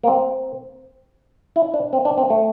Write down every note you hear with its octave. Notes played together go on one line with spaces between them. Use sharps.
A#3
C4
E4
D4
C4
D4
C4
A3